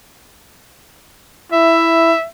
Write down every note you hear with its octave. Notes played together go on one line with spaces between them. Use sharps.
E4 E5